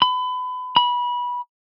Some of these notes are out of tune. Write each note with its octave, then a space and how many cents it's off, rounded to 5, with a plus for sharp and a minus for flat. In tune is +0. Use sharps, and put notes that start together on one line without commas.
B5 +30
B5 -20